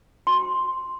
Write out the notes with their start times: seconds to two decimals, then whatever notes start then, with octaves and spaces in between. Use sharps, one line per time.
0.27 C6